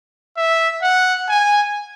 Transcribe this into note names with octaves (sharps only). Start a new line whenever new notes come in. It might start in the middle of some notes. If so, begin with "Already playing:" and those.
E5
F#5
G#5